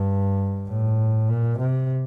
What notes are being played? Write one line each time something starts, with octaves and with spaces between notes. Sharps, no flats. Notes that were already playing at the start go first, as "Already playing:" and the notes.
Already playing: G2
A2
A#2
C3